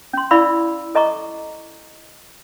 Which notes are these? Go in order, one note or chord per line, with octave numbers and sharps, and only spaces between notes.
C#4 C6
E4 D5 F5 B5 C#6 E6
A4 D#5 A#5 C#6 D6